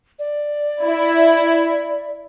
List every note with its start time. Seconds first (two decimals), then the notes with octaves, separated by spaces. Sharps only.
0.19 D5
0.83 E4